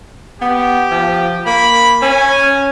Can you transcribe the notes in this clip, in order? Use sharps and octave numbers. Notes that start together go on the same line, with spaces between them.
B3 G4
F3
A#3 B5
C#4 G#5